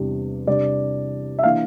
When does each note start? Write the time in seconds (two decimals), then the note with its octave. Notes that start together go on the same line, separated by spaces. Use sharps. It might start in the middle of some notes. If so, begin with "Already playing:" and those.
Already playing: E2 C3 G3 D4
0.47 C3 G3 D4 D5
1.39 E5
1.43 E3 A#3 D4 F5